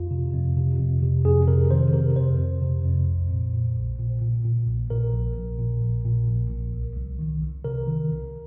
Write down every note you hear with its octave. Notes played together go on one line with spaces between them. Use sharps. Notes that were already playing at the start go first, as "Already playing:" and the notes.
Already playing: F2 F4
C3
F2
C3
F2
C3
F2 G#4
C3 A#4
D#3 C5
C3 A#4
F2 C5
F2
C3
F2
A#1
A#2
A#2
A#1
A#2
A#2
A#2
A#1
A#2 A#4
A#1
A#1
A#2
A#1
A#2
A#1
A#1
C2
C2
D#3
C2
C3 A#4
D#3
C2